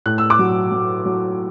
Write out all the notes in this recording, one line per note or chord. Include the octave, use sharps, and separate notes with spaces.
A2 F#6
E6
D6 F#6
F#3
F#3
F#3